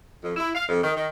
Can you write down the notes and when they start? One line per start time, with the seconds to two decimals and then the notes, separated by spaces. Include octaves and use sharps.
0.23 F2
0.37 E4
0.55 F5
0.68 F2
0.82 D#3
0.96 D#3